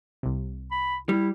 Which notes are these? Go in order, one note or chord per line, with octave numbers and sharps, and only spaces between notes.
C2 C3
B5
G3 E4